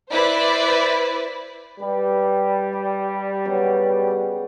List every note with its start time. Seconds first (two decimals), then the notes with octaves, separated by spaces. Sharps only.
0.11 E4 B4 C5 D5
1.80 G3 G4 B4
2.73 G4
3.45 C#3 F#3 B3
4.07 G4 F#5